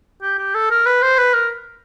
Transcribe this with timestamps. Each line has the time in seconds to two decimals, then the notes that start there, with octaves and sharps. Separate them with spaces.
0.22 G4
0.38 G4
0.55 A4
0.71 A#4
0.86 B4
1.02 C5
1.18 B4
1.34 A#4